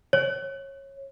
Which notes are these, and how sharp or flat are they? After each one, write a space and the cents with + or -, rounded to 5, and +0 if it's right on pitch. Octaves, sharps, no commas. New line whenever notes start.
C#5 -20